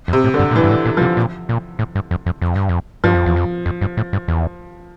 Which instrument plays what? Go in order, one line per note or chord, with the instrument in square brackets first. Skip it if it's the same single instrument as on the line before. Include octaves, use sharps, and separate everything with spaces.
[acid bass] F2
[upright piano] C3
[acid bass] A2
[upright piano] D3
[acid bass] G2
A#2
[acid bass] A2 [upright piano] E3
[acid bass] G2
A2
A#2
[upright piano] F3
[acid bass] C3
A#2
A#2
A2
G2
F2
F2
F2
G2
F2
[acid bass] G2 [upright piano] F3
[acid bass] F2
E2
F2
F2
G2
A2
G2
E2